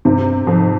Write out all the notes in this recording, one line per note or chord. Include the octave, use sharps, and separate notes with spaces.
G2 C3
F2 G#2